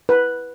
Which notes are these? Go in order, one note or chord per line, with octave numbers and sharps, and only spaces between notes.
B4